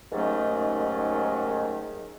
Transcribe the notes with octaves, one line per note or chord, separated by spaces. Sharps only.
D#2 G#2 D#3 F#3 A3 C#4